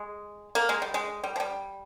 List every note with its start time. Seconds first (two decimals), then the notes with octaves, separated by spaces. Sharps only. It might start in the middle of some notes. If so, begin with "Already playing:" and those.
Already playing: G#3
0.55 A#3
0.69 G#3
0.82 G3
0.94 G#3
1.24 G3
1.36 F3
1.40 G3